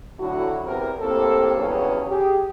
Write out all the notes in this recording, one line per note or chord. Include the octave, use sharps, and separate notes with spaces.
A2 D3 F#3 E4 F#4
E2 C3 A#4
A2 A#3 C4 G4 A4
E2 G2 C#3 F#3 C#4
G4 G#4